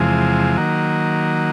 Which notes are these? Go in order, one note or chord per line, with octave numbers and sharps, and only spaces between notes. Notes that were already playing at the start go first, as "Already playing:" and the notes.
Already playing: E2 C3 F3 G#3
D#3 F#3 A#3